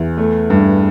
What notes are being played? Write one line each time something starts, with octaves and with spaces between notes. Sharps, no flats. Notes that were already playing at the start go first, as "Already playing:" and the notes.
Already playing: E2
A3
G2